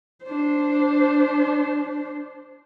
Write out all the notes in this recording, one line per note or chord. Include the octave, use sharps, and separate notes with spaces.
D4 C5